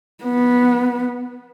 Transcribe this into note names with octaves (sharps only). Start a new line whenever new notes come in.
B3